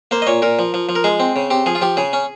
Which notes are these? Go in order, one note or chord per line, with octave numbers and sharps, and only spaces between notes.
A#3 C5
D#5
A#2 C#5
A#2 A#4
F3
F3
F3
A#4
G#3 G#4
C4
C#3
C4 G4
F3 G#4
F4
F3 G4
C#3 G#4
C#4